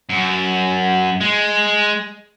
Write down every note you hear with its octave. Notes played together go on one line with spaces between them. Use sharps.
F#2
G#3